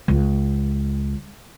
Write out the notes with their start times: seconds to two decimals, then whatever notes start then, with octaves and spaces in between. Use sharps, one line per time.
0.08 C#2